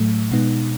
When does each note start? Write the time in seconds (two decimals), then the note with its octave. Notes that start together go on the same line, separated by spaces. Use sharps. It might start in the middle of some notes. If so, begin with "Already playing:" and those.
Already playing: A2 F#3 A3
0.31 B2 G#3 B3 D#4